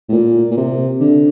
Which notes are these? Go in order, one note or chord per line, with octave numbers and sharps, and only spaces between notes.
A2
A#2
A#2
C3
D3